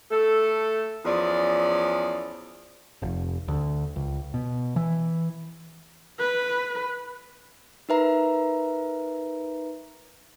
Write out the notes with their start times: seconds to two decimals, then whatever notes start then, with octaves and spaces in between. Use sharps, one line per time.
0.11 A3 A4
1.05 E2 F3 C#4 D5
3.02 F1
3.48 D2
3.96 C#2
4.34 B2
4.76 E3
6.19 B4
7.89 D#4 A#4 B4 E5 A#5 B5